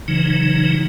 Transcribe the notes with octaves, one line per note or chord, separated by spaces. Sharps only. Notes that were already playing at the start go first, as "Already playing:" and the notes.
C#3 E3 F#3 D#4